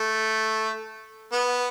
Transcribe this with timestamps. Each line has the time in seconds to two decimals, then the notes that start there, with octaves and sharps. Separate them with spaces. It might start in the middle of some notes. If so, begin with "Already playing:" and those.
Already playing: A3
1.32 B3